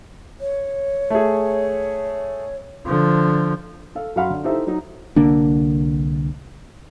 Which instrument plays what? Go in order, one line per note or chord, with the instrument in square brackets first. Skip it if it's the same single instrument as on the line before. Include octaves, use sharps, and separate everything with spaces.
[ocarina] C#5
[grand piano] A3 G#4
[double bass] D3 F3
[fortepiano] A4 F5
F#2 F#4 F5 F#5 B5 C6
D3
D#4 E4 G4 A4 C5 E5
F#3 D#4
[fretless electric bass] C2 D3 A#3 D4